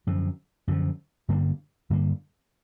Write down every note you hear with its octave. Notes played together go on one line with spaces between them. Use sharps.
F#2 D3 F3
F#2 D3 F3
G2 D3 G3 A#3
G2 D3 G3 A#3